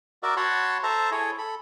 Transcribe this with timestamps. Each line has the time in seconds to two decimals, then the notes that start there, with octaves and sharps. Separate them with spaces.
0.23 F#4 A#4 D5 E5
0.37 F#4 C#5 F#5 A5 B5 C6
0.83 A4 C5 E5 A5 A#5
1.11 E4 G#4 A4 C#5
1.38 A4 B5